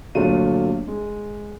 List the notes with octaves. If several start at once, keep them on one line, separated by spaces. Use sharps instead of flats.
G1 A#2 F#3 A3 F4 D#7
G#3